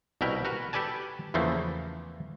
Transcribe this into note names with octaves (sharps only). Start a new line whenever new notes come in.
C2 B2 E4 A#4 B4 G5
F#4 A#4 B4
G4 A4 B4 D5 G#5 A5
E2 C#3 E3 F3 A3 A#3